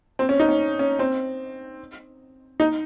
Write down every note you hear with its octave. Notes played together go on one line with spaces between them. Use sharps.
C4
C#4
D#4
C#4
C#4
C4
D#4